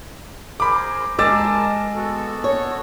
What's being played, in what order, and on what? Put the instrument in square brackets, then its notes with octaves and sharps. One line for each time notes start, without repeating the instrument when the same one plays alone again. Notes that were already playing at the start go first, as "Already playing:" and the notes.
[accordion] G#4 A#4 C5 [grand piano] B5 D6
[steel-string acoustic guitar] G#3 [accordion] A#4 D#5 A5 [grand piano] D6 E6 A6
[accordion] B3 F#4 A4
[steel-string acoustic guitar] C#5